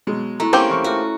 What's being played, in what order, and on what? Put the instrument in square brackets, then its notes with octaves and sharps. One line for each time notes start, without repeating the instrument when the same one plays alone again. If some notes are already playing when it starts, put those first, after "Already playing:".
[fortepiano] B2 F#3 G#3
[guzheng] A3 [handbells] E4 A#5
[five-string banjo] A#3 C4 G4 [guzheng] C#4
[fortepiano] E3 F5 C#6
[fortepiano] A3 F4 [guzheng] F#4